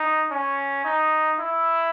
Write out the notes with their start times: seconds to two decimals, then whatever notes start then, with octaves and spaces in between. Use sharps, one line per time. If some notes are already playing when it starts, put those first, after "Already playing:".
Already playing: D#4
0.31 C#4
0.85 D#4
1.40 E4